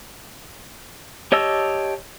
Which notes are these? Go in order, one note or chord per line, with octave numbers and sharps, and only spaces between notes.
G4 C#5 D#5 A5 E6